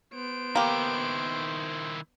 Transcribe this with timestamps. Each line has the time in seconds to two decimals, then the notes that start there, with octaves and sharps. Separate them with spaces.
0.13 B3 C5 D7
0.55 D#3 A#3 E4 G4